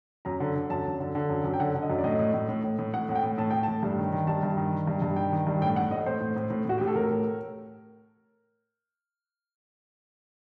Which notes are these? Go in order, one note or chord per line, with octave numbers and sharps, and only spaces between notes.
F#2 A#5
D3
D3
F#2 A5
F#2
D3
D3
F#2
F#2
G5
D3 F#5
D3
D#5
F#2
D5
A2 D#5
A2
A2
A2
A2
A2
A2 F#5
A2 F#5
G5
A2
A2 A5
A2 G5
A5
A2
G2
D#3
D#3
G2 A5
G2
D#3
D#3
G2
G2
D#3 G5
D#3
G2
A2 G5
A2 F#5
A2 D#5
A2 C5
A2
A2
A2
A2 F#4
A2 G4
A4
A2 A#4
A2